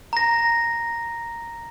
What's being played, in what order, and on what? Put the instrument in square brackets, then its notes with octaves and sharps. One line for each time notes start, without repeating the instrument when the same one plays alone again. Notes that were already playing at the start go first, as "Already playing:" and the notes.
[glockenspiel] A#5 A#6